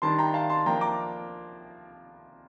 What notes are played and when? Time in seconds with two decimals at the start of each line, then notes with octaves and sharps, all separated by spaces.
0.02 D#3 G3 D4 A5 C6
0.18 G5 A#5
0.34 F5 A5
0.49 A5 C6
0.66 F3 A#3 D4 G5 A#5
0.81 A#5 D6